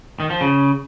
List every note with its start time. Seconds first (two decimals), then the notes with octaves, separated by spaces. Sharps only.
0.20 D#3
0.30 F3
0.41 C#3